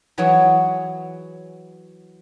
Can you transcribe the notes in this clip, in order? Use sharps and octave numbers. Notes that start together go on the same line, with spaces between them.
E3 F#3 E4 F#4 G#4 C#5